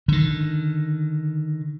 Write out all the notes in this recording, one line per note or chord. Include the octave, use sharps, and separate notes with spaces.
D3 D#3